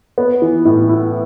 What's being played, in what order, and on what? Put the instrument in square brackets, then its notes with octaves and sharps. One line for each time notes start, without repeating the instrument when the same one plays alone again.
[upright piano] B3
E3
A2
E4